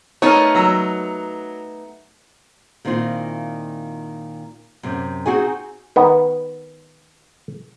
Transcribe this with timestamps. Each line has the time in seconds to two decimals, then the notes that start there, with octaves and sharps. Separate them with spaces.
0.22 A3 B3 D#4 A#4 C#5
0.55 F#3 A#5 E6
2.85 A#2 D#3 C4 E4 F4
4.83 F#2 C3
5.26 C4 D#4 F#4 G#4 G#5
5.96 D#3 B3